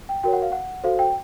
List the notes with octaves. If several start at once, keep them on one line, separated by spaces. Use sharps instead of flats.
G5
F#4 A#4 C#5 G5
F#5
F5
F#5
F#4 A4 C5 F5
G5